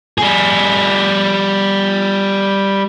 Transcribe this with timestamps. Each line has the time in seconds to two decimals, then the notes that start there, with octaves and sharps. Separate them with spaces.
0.18 G3 G#4